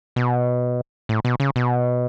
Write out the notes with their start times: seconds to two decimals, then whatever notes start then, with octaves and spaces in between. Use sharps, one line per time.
0.16 B2
1.09 A2
1.25 B2
1.40 C#3
1.56 B2